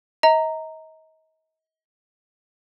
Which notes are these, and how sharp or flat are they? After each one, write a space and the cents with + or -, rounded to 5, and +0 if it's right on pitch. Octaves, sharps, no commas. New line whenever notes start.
D#5 +35 A#5 -10